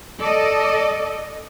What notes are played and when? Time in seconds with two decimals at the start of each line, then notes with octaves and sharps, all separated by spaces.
0.22 A4 D5 D#5